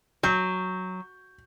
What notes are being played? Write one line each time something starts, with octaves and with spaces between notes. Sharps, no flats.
F#3 G6